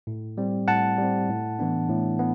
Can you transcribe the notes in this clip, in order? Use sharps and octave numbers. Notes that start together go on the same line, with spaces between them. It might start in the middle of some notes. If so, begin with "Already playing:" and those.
A2
G3 C4
A2 F#5 A5
G3 C4
A2
E3 B3 D4
A2
B3